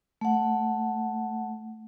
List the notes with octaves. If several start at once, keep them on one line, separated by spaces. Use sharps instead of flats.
A3 F#5